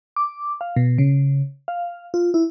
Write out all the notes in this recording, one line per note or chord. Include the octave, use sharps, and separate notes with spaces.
D6
F5
B2
C#3
F5
F4
E4